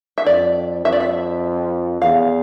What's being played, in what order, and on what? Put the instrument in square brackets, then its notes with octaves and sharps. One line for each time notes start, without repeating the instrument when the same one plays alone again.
[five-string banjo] E5
[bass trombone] F2 [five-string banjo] D5
[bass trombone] F2 [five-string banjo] E5
[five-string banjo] D5
E5
[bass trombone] E2 [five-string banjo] F5